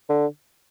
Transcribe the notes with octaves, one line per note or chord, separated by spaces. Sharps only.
D3